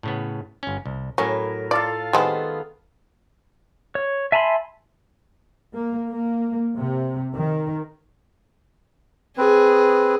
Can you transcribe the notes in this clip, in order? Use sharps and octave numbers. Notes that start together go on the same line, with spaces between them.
A2 C#3 B3
G1 C#4
C2
A2 F#3 C#4 A#4
F4 A4 D5 F5
D#3 G3 G#3 B3 C4 G#4 A4 A5
C#5
E5 G#5 A5 B5 C6
A#3
A#3
C3
D#3
C4 G#4 B4